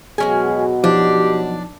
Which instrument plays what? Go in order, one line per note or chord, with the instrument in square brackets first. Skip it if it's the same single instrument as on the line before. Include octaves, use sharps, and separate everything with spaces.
[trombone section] B2 F#3 [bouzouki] G#3 C#4 G#5 [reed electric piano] G#4
[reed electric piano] F3 D#4 [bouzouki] D4 [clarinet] G4